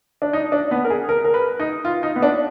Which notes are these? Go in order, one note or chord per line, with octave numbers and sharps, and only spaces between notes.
D4
D#4
D4
B3
A#4
G#4
A#4
A#4
B4
D#4
F4
D#4
B3
D4